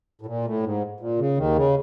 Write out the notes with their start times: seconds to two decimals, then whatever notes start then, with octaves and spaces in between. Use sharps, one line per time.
0.21 A2
0.26 A#2
0.45 A2
0.63 G#2
1.00 A#2
1.19 C#3
1.37 D#2 D#3
1.56 C#3